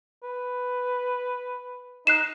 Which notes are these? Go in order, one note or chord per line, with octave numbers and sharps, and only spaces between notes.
B4
D#4 F#6 C7 E7